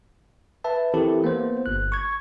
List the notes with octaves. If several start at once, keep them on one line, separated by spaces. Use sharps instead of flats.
B4 E5 A5
E3 C4 E4 G4 A4 A#4
A#3 B3 C5
G1 F#6
C#6 G#6